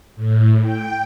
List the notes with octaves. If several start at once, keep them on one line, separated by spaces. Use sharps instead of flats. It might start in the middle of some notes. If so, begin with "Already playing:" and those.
A2
G5